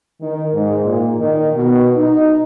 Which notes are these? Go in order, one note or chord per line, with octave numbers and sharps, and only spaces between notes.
D#3
G#2
A#2
D#3
B2
D#4